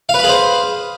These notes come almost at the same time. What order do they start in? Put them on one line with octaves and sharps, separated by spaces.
F5 B4 B5 G#4 C5